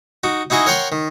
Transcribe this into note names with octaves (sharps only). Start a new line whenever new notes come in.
D#4 F#4
D#4 E4 F#4 G#4 D#5
A#4 C#5 F#5 G5 A#5 C6
D#3